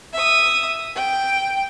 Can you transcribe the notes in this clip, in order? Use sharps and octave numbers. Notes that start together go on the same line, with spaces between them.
E5 D#6
G5